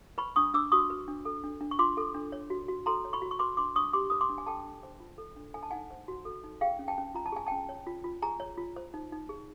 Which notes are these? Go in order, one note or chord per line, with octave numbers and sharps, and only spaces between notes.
B4 B5 C#6
D4 C#6 D#6
D4 D6 E6
F#4 C#6 D#6
B4
D4
A4
D4
D4
C#6
F4 C6 D6
A4
D4
C#5
F#4
F#4
A4 A#5 C6
C#5
B5 C#6
F#4
C#6
B4 C6 D6
D4 C6 D6
D4 C#6 D#6
G4 C6 D6
B4 D#6
C6 D6
D4
G#5
A4 G5 A5
D4
C5
F4
A4
D4
A4 G#5
A5
D#4 F#5 G#5
C5
F#4
A4
D#4
G#4 F5 G5
C#4
G5 A5
C#4
F4 A#5
A5
G#4 G#5
C#4 G5 A5
C#5
F4
F4
G#4 G#5 A#5
C#5
F4
C5
D#4
D#4
G#4